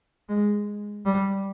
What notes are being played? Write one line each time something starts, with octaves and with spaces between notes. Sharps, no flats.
G#3
G3